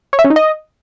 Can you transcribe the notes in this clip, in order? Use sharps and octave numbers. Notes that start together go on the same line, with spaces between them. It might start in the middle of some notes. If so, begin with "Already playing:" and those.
C#5
E5
C#4
D#4
D#5